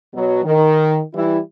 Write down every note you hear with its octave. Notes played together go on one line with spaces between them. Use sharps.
B2 F#3
D#3
E3 G3 E4